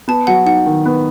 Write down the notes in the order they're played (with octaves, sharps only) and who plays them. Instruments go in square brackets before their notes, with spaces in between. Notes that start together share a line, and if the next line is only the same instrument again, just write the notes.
[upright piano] B3 [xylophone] A5
[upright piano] F#3 [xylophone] F#5
[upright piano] D#4 [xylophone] F#5
[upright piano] D#3
B3